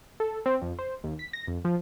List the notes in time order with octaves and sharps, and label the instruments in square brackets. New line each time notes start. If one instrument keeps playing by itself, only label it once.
[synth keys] A4
C4
F2
C5
D#2
B6
A#6
F2
F3